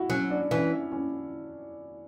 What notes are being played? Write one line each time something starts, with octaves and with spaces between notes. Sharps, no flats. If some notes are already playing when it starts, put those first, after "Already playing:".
Already playing: E4 F#4
F#3 C#4
D4
E3 C#4
C#4